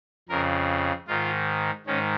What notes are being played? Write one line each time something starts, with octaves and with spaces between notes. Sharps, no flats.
F2 C#3 A#4
G#2 D#3 F4
G#2 D#3 C#4